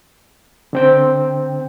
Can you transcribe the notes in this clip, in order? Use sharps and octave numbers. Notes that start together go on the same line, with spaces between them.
D3 C4 G5